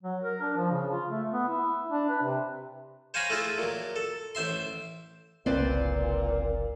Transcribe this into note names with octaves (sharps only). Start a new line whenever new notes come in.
F#3
A#4
D4
F3
C#3
F4
A3
B3
E4
D4
B4
C3
C5 C#5 F5 G#5 A#5 B5
A3 E4 F4 G#4
A#2 F#3
A4
A1 C5 E5 C6
F#1 C2 A#2 C4 B4 D5